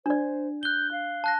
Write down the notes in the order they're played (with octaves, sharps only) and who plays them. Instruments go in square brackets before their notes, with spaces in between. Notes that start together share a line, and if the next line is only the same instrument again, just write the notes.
[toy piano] D4 D5 [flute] C5
[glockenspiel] F#6 G7 [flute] G6
[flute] F5
[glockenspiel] A5 F#6 A#6